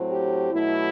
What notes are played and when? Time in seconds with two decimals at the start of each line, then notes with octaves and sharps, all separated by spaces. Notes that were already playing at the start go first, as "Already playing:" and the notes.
Already playing: A2 F#3 C4
0.09 G4
0.51 B2 F#3 A3 E4